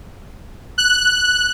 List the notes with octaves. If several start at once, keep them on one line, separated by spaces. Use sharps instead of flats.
F#6